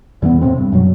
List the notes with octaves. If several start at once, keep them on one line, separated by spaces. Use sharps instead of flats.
E2 E3 F3 B3
E1 A2 C3 C4
G2
F#2 B2 F#3